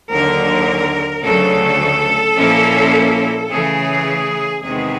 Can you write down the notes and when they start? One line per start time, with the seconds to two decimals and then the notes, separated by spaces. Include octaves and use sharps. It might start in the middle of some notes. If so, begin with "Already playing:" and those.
0.10 D#2 D3 F#3 A#4
1.23 D2 C#3 F#3 A4
2.36 A#2 F3 A#3 C#4 E4
3.50 C#3 E3 A3 G#4
4.63 E2 C3 D#3 G#3 B3 G#4